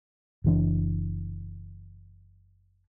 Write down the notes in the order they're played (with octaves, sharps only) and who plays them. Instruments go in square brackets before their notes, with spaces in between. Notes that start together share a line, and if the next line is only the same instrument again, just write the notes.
[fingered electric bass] F#1 E3 D4